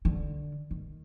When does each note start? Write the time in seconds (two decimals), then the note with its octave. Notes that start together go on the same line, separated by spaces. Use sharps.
0.05 D3
0.71 D#3